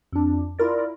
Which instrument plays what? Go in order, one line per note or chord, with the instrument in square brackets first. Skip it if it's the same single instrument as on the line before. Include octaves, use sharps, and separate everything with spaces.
[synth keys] F2 D4
E4 F4 A#4 D5